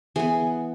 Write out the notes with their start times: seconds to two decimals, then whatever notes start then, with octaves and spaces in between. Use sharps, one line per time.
0.16 E3 B3 G#4